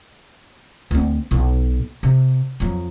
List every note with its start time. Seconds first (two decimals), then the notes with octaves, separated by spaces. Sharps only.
0.91 D2 C4
1.31 B1 B2
2.03 C3
2.60 F2 F#3